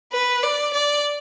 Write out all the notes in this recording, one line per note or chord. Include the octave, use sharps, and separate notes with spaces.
B4
D5
D5